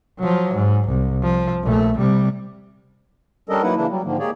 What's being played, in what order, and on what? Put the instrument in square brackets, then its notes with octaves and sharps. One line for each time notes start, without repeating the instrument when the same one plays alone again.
[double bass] F3 F#3
G#2
C2
F3
A#1 A3
C3 G3
[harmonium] G3 C#4 D4 A4 A#4 D#5
F#3 A#3 D#4 E4 B4 F#5
C#3 E3 A#3 D4 E4
F#3 G3
G#2 D3 D#3 F3 A#3
G#3 A#3 G4 G#4 C#5 D5